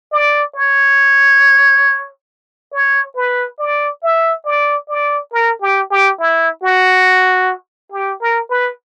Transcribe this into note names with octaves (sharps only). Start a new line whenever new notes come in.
D5
C#5
C#5
B4
D5
E5
D5
D5
A#4
G4
G4
E4
F#4
G4
A#4
B4